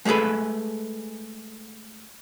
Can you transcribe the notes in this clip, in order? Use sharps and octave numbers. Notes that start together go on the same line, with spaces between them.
G#3 A3 G#4 A4 B4